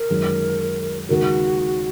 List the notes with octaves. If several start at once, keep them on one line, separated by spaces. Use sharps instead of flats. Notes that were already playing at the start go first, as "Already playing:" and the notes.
Already playing: A#4
F#2 D#3 G#3
D#2 C#3 G#3 D#4 F#4 A#4